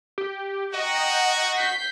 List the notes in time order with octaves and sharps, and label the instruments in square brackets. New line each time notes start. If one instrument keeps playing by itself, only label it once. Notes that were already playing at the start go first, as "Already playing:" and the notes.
[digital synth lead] G4
[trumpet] F#4 [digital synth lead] D#5 [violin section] F#5 G5 A#5
[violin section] G6 B6 C7